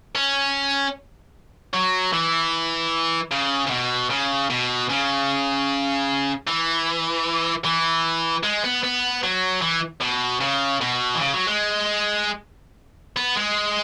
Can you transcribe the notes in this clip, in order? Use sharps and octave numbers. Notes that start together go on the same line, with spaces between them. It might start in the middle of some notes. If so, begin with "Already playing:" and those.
C#4
F#3
E3
C#3
C#3
B2
C#3
B2
C#3
E3
E3
G#3
B3
B3
F#3
E3
B2
C#3
B2
E3
C#3
F#3
G#3
B3
G#3